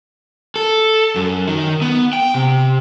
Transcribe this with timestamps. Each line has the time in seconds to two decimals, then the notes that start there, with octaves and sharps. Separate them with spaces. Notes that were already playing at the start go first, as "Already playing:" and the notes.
0.56 A4
1.16 F#2
1.48 D#3
1.82 B3
2.13 G5
2.34 C3